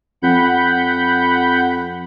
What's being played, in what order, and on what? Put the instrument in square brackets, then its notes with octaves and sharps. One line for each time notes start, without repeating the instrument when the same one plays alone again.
[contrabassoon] F2 [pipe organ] F#5 B5 G6